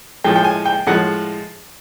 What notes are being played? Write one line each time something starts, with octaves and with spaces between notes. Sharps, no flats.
A2 F3 G#3 G5
G5
G#5
G5
A2 F3 G#3 F#5